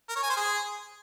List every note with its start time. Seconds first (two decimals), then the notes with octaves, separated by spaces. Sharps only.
0.09 A#4
0.16 C#5
0.23 G#5
0.30 C5
0.37 G#4